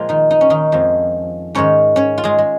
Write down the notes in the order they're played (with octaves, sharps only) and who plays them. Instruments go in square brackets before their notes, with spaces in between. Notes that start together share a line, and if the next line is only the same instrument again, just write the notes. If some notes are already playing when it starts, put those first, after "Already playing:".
Already playing: [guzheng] A#2 F3 G#3 A#3 F4 A#4
D#3 D#4
D#4
C#4
D#3 D#4
F2 F3 G#3
G#2 D#3 G#3 C#4 C#5
C#4 C#5
F4
G#3 G#4
G#3